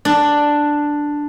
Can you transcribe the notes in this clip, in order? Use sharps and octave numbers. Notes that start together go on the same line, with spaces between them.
D4